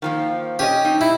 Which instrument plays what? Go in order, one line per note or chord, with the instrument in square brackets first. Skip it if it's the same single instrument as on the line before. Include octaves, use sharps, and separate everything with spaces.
[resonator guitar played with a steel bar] D#3 F3 A#3
[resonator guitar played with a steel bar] C#4 D4 D#5 [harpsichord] G4
[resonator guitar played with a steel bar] C4 D#4
[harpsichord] E4